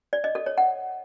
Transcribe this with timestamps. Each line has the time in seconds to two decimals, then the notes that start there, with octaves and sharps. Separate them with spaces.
0.13 D5
0.24 D#5
0.35 A4
0.46 C#5
0.58 F#5